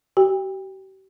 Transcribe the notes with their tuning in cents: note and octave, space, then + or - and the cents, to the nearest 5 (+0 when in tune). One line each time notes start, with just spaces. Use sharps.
G4 -40 G5 +35